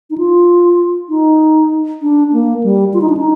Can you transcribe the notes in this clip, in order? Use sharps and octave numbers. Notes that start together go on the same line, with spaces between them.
D#4
F4
D#4
D4
A#3
G3
F4
D#4
D4
D#4